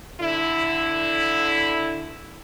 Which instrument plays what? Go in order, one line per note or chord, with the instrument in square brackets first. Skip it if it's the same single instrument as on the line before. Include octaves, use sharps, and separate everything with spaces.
[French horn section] D3 E4